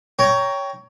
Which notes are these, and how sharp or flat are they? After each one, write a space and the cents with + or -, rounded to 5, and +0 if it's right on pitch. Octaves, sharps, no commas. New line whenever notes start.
C#5 +15 G5 +0 A#5 +0